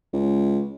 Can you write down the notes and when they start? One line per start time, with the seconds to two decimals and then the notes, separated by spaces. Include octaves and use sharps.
0.13 C#2